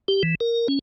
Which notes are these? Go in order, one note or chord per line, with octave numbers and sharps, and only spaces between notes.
G4
E3
A#4
C#4